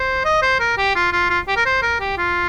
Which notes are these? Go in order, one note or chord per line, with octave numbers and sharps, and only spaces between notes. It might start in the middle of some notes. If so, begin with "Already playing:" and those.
Already playing: C5
D#5
C5
A#4
G4
F4
F4
F4
G4
A#4
C5
A#4
G4
F4